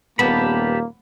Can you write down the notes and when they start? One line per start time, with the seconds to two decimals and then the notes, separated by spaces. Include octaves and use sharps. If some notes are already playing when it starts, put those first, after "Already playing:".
0.19 D#1 A#3 B3 G4 A5 B5